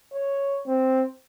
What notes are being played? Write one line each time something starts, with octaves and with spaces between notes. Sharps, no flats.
C#5
C4